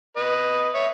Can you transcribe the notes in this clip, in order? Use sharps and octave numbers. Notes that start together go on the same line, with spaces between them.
B4 D#5
C#5 E5